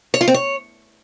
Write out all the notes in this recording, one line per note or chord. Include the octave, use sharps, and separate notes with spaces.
C#5
F4
C4
C#5